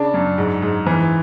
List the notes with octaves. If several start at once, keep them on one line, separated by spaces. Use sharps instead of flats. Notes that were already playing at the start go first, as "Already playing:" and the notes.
Already playing: C#3 D4
F#2
G#2
G#2
E3